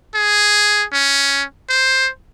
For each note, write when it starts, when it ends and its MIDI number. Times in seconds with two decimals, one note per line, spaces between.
0.15 0.84 68
0.93 1.44 61
1.69 2.09 72